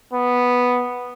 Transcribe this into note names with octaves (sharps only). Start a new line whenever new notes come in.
B3